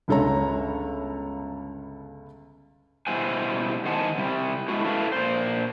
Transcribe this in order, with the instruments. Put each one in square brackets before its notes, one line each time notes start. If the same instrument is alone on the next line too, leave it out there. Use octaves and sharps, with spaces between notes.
[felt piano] G1 C#2 A4 C#5 A#5
[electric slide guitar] B2 G3 E4 C5 F#5 G#5
D#3 D#4 C5 F#5 G#5 A5
C3 G3
G#3 A3 E4 F#4
E4 A4 B4 F5
A#2 C5